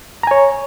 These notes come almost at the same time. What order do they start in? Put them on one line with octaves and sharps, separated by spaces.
A#5 G#5 C#5